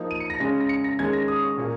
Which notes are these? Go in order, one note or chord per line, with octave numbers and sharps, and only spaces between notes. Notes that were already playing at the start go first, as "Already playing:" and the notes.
Already playing: F3 A#3 D#4
D#7
C#7
A#6
C#3 G#3 C#4 A#6
A#6
C#7
A#6
D#3 G#3 C#4 G#6
A#6
D#6
C#6
A#2 A#3